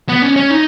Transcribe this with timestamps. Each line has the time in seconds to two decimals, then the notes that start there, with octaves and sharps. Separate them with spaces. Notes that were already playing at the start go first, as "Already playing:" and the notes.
0.09 B3
0.22 C#4
0.36 C#4
0.50 D#4